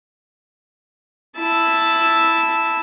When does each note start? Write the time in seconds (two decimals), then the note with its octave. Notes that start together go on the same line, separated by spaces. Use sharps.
1.38 E4 A5